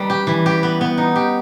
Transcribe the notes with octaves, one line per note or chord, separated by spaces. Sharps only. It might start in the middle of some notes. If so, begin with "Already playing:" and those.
Already playing: G3 D#4 B4
G4
E3
G4
B3
B3
D#4
G4